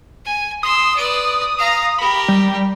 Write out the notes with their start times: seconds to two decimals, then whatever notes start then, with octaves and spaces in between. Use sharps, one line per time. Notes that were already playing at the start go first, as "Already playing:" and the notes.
0.25 G#5
0.63 C6 D#6 E6
0.96 B4 D5
1.58 F5 A#5
1.99 G4 A#4 B5
2.28 G3